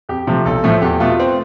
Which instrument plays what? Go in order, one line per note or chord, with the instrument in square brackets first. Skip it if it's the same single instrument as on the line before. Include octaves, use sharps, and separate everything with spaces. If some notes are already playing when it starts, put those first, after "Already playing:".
[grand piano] F2 G4
C3 F3 A3
B1 A4
A2 F3 A3
E2 G4
B2 A3 F4
C4